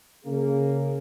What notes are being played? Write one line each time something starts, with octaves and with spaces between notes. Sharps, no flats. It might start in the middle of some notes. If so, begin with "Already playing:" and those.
C#3 A#3 G#4